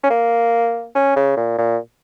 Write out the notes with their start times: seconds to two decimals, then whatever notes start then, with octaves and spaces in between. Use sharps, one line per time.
0.03 C#4
0.10 A#3
0.95 C#4
1.16 C#3
1.37 A#2
1.58 A#2